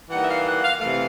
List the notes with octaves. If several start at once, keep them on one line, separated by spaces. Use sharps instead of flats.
E3 G3 A#3 D#4 F#5
E5
F5
F#5
F5
C3 E3 A3 F5